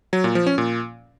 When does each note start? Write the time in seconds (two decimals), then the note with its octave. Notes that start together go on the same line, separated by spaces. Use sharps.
0.13 F#3
0.24 A#2
0.35 F3
0.47 C#4
0.58 A#2